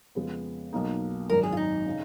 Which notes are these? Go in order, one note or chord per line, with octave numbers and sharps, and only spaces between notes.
F2 C#3 G#3 B3
B1 B2 A#3 D#4
G#1 F#2 D#3 A#4
G#4
F4
D#4
C#3